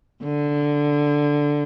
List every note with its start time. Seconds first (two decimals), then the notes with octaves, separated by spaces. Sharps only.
0.23 D3